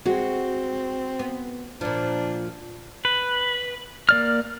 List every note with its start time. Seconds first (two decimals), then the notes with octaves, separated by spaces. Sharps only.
0.06 G#3 C4 F#4
1.19 B3
1.81 A#2 F3 D4
3.05 B4
4.09 A#3 D5 F6